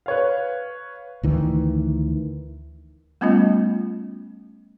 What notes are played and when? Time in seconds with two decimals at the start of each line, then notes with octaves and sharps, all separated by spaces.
0.06 B4 C#5 F5
1.23 D2 D#3 E3
3.21 G3 A3 B3 C#4 F4 D#5